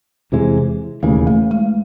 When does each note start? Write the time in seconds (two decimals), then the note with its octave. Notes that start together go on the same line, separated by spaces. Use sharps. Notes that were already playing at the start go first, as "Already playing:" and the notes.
0.32 E2 C3 E3 G#3
1.03 E1 D#2 C#3 E3 A3
1.27 A3
1.51 G#3